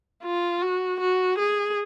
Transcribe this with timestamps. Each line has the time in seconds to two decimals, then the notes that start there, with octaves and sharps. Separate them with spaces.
0.24 F4
0.62 F#4
1.00 F#4
1.39 G#4